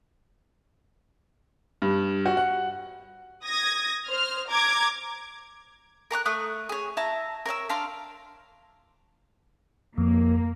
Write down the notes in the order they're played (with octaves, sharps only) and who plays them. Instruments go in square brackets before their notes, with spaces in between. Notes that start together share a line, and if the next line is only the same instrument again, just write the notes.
[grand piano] G2
F#4
F#5
[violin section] D#6 G#6 A#6
C5 F6
A#5 D6 G#6
[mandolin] A#4 A#5 C#6 F#6
A3 C#6 D#6 F#6
G#4 C#5
E4 E5 A5 A#5
A#4 C#5 E5 E6
D4 F5 A#5 C6
[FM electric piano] F2 [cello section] A#3